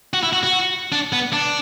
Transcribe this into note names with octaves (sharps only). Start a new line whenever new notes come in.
F#4
E4
F#4
F#4
D4
B3
D4